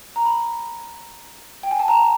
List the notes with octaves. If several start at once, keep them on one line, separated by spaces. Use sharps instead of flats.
A#5
B5
G5
G#5
A5
A#5